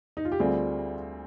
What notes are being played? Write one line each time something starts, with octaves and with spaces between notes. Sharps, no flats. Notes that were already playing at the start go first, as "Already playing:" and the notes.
D#4
F4
G4
D2 D3 G3 C4 F4 G#4